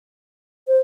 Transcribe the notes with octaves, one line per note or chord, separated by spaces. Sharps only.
C5